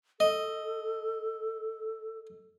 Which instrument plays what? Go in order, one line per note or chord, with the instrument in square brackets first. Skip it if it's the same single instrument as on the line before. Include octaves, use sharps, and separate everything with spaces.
[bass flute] A4 [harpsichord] D#5